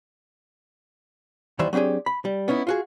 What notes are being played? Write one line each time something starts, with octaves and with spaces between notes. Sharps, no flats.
D#2 D#3 E3 G3 C5 E5
F#3 C4 D4 G4 G#4
B5
G3
B3 C#4 D#4 E4
F4 F#4 G#4